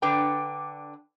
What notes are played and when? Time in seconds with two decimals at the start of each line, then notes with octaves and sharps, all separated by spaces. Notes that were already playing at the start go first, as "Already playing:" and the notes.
0.02 D3 D4 B4 G5 A#5